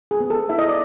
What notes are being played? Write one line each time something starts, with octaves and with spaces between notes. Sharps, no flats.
G#4
B3
A4
E4 E5
D#5
D5